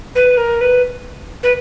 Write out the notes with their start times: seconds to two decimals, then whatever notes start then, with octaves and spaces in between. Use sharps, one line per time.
0.15 B4
0.37 A#4
0.61 B4
1.43 B4